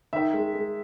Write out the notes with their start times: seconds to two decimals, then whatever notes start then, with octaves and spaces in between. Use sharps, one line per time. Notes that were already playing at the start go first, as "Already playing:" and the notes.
0.13 D#3 E5
0.33 G#3
0.54 G#3